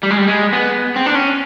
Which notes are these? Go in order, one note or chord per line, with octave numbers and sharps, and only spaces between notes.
G3
G#3
G3
G#3
B3
C4
D4
C#4